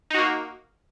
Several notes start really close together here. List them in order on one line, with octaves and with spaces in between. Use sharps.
D#4 F#4 A#3